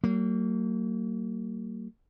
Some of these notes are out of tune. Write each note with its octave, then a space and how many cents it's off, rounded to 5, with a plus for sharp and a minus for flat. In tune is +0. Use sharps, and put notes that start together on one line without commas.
F#3 +40 A#3 -30